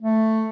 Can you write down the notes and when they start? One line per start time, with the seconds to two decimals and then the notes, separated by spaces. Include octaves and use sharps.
0.01 A3